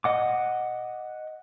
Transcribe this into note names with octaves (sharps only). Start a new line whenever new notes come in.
D#5 F#5 D6